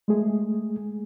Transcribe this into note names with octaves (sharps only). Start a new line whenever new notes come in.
G#3 A3 G#4